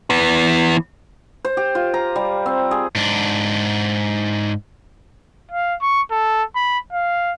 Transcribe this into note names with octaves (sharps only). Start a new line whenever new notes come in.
E3 B3
C5
G4
F4
A#5
G3
C4
G#4
G#2 D4
F5
C#6
A4
B5
F5